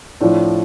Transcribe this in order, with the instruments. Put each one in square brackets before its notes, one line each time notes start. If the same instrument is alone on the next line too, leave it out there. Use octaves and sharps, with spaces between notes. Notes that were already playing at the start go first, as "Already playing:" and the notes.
[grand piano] A2 F3 D4